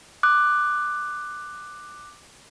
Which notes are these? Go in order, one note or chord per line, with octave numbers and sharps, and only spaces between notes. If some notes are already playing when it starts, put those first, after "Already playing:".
D6 D#6 F#6